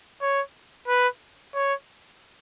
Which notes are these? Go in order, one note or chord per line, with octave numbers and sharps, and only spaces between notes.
C#5
B4
C#5